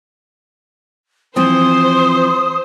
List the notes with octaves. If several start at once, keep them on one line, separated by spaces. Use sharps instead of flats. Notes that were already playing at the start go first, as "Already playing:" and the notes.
E3 F3 C4 C5 C6 D#6